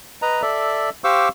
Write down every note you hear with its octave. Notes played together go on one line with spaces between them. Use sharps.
B4 D#5 A#5
A4 D5 E5
G4 C5 F5 C#6 D6 E6